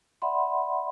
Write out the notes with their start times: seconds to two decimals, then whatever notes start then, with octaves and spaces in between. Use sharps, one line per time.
0.22 D5 E5 F#5 B5 C6